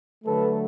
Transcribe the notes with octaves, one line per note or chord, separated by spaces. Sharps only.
D3 F#3 A3 A4 B4